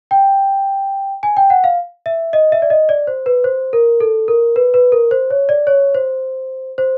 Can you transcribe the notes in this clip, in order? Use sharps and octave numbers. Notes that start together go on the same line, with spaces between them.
G5
G#5
G5
F#5
F5
E5
D#5
E5
D5
D#5
D5
C5
B4
C5
A#4
A4
A#4
B4
B4
A#4
C5
C#5
D5
C#5
C5
C5